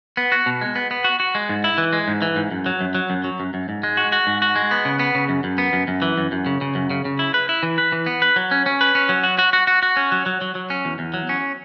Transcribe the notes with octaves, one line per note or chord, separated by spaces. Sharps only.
B3
F#4
B2
G#3
B3
B3
F#4
F#4
G#3
G#2
E4
E3
G#3
G#2
E3
G#2
F#2
F#3
F#2
F#3
F#2
F#3
F#2
F#2
G#2
G#3
F#4
F#4
G#2
F#4
G#3
B3
C#3
B3
C#3
F#2
F#2
B3
F#2
F#2
E3
F#2
F#2
C#3
C#3
F#2
C#3
C#3
E4
B4
E4
E3
B4
E3
B3
B4
F#3
C#4
C#4
B4
C#4
F#3
F#4
F#4
F#4
F#4
F#4
C#4
F#3
F#3
F#3
F#3
C#4
E2
E2
F#3
C#4